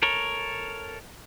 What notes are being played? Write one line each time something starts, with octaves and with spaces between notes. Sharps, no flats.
A4 A#4 C#5